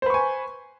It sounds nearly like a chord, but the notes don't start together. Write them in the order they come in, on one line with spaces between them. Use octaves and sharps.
C5 B4 C#6 G#5